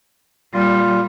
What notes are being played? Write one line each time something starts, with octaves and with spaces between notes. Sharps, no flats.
A#2 G3 F4